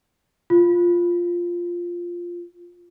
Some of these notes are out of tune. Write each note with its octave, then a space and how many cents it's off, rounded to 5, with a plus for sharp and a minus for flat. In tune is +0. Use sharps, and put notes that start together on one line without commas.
F4 +0